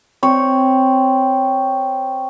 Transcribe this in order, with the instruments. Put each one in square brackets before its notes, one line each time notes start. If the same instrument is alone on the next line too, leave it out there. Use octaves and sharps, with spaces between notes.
[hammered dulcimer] C4 C#5